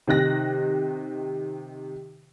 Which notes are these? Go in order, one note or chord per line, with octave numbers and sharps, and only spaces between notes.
C3 D#3 F#6 A#6